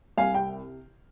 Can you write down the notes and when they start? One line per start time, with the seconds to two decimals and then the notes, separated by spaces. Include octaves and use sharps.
0.17 C2 F5 G#5
0.34 C3 G5